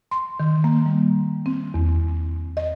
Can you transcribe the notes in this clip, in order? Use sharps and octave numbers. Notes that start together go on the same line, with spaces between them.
C6
D#3
A#3
G3
C4
E2
D#5